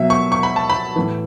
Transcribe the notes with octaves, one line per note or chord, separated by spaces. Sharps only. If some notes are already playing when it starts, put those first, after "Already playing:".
Already playing: B2 F#3 E5
C#6
C#6
B5
A5
B5
A2 E3